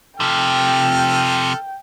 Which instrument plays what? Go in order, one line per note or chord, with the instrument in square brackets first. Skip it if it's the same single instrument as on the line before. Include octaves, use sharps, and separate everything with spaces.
[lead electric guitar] C3 F3 [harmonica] A4 F6 [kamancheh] G5